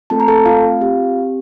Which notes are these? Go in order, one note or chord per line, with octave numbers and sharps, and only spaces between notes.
A3 C4 F4 A4 A5
A#5
A4 A5
F4 F5
C4 G4